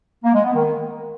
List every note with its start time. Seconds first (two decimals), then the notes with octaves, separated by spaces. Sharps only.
0.24 A#3
0.34 G#3
0.44 B3
0.53 D#3